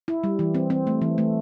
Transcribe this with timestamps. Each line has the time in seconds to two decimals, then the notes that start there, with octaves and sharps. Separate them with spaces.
0.08 E4
0.24 G3
0.39 E3
0.55 C4
0.70 C4
0.87 A3
1.02 E3
1.18 A3